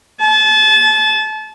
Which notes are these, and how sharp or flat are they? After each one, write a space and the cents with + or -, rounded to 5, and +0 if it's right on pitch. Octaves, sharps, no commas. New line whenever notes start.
A5 -30